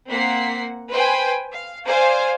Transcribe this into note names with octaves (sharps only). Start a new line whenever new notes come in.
A#3 C4 F#5 B6 C7
B4 C5 G5 G#5
F5
C5 D5 F5 G#5